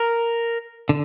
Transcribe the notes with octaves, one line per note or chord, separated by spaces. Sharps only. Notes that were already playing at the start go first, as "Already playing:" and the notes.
Already playing: A#4
D3